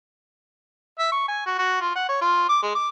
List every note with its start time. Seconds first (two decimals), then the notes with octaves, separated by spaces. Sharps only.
0.99 E5
1.12 C#6
1.29 G#5
1.46 F#4
1.58 F#4
1.81 F4
1.96 F#5
2.09 C#5
2.21 F4
2.49 D6
2.63 G#3
2.75 D6